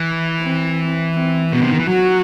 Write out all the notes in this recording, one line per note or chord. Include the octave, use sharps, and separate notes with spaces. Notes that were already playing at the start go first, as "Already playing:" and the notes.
Already playing: E3
C4
C4
B2 B3
C3
D#3
E3
F#3 F#4